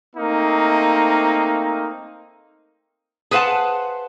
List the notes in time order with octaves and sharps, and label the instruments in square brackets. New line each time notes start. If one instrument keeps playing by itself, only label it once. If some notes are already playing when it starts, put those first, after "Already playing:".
[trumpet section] A3 A#3 C4 D#4
[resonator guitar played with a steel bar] G#4 B4 C5 F5 F#5 A5